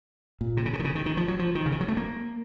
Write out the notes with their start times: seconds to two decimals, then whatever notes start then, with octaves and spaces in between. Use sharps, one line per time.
0.41 A#2
0.57 C3
0.66 C#3
0.73 C3
0.79 D#3
0.85 C#3
0.95 D#3
1.06 D#3
1.17 F3
1.28 F#3
1.39 F3
1.55 D#3
1.66 C#3
1.72 D#3
1.81 F#3
1.88 A3
1.97 A#3